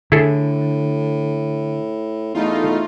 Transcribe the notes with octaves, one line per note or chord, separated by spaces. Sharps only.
A2 D3 E4 G#4 A4
E2 A3 D#4 F4